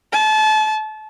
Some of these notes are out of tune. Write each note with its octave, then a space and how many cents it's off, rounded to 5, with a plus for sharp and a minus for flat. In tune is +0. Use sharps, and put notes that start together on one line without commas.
A5 -30